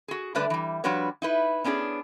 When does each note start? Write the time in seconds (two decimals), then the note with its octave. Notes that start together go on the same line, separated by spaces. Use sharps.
0.08 F#4 G#4
0.35 D3 G3 A3 D4 B4 D5
0.50 E3 G3
0.84 F3 G3 D4 F#4 B4 C#5
1.22 D#4 E4 B4
1.64 B3 C#4 D4 F4 G#4